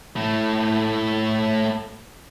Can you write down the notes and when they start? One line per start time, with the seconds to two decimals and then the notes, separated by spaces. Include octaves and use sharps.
0.16 A2 A3